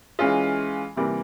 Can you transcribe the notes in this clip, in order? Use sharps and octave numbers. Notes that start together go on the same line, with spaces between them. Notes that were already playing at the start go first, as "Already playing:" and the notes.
E3 G#3 C#4 F4
C3 E3 G3 A#3